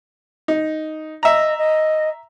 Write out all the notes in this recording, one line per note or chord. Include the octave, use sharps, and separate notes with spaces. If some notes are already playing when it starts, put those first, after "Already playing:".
D#4
D#5 E5 A#5
D#5